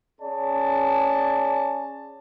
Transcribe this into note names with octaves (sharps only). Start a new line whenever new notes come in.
C#4 G#4 C#5 D5 A5